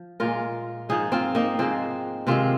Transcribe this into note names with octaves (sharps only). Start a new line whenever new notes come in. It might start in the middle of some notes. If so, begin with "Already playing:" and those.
Already playing: F3
A#2 G#3 F4 A#4
G#2 F3 G#3 D#4 G#4
C4 F4
A#3 D#4
G#2 F3 G#3 C4
C3 D#3 G#3 C4 F4